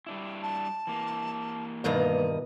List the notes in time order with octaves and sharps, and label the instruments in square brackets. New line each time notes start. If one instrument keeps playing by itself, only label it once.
[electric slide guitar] G3 D4 E4
[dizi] A5
[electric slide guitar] E3 A#3
[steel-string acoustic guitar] G2 D#3 D#5 [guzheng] B2 E4 F#4